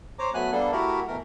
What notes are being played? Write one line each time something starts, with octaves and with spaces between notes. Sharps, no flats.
C5 C#5 A#5 D6
F#3 A3 B3 G#5 F#6
G3 A#3 B3 D4 A4
A3 E4 F#4 G4 A#4
B2 E3 A3 A#4